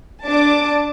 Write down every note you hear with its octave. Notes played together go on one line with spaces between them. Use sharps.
D4 A5 D6